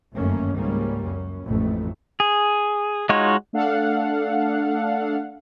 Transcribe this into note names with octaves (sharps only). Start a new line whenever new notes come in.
G1 F#2 D#3 A3 A#3 C#4
C#2 G#2 G3 A#3 C#4
F#2 C#4
A1 F2 G#2 A3
G#4
G#3 D#4 F4 F#4 C#5
A3 D4 A4 F5 F#5